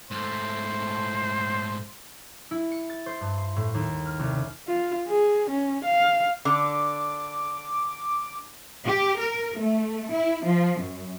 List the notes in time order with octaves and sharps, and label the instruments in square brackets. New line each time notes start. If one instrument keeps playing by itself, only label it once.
[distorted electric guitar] G#2 A3 [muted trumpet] C5
[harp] E4
C#7
A6
C5
G2
C6
A2
D#2
F6
C2
C#3
[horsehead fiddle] F4
G#4
C#4
F5
[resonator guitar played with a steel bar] D3 [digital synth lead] D6
[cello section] G4
A#4
A3
E4
F3
F#2